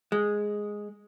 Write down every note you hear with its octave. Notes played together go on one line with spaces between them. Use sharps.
G#3